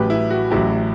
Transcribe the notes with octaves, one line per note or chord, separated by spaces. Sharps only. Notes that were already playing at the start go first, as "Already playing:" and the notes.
Already playing: A1 A2 F#3 G4 B4
E4
F#4
A1 A2 F#3 E4 G4